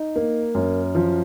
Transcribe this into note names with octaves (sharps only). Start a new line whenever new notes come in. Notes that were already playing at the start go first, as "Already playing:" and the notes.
Already playing: D#4
A#3
F#2
F3